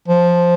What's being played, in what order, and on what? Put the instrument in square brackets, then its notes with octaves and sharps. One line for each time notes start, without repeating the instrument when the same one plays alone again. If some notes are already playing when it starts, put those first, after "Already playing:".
[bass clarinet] F3